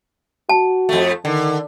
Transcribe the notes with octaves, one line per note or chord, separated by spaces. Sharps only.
F#4 A5
F2 A3
D3 D#3